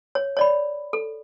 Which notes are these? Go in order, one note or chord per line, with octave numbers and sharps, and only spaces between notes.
C#5
C#5 D5 B5
A4